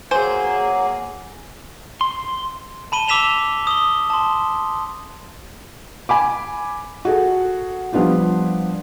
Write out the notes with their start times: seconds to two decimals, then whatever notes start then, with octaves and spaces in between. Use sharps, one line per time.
0.11 F#3 A#3 G#4 C5 G#5
2.01 C6
2.92 A5 B5 D#7 G7
3.08 D6 E6 B6 E7 F7 G7
3.67 D#6 G7
4.10 A5 C6
6.09 G#5 B5 D6
7.05 F#4 G#4 A4
7.93 F3 G3 B3 D4 F4 G4